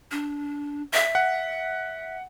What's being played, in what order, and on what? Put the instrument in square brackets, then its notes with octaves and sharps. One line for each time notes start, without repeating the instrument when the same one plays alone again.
[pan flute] D4
E5
[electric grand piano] F#5